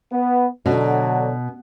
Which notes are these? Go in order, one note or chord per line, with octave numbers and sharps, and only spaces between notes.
B3
B2 D3 F#3